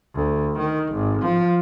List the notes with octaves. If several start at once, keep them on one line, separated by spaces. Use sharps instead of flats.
D2
D#3
G#1
F3